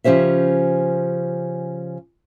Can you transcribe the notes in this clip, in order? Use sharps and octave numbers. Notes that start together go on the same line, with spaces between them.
C#3 F3 C#4 G4 C5 E5